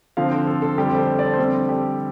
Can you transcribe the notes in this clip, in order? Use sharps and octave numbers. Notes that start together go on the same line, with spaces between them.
D3 F3 C4 F5
C5
A4
A4
F2 D3 G3 D4 G4
C5
A4
D5
C5
F2 D3 G3 C4 A4
G4